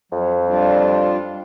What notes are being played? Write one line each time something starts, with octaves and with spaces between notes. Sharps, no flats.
F2 F#3
G3 D4 F4